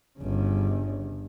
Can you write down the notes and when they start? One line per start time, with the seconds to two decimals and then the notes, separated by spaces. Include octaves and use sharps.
0.19 G1 C#3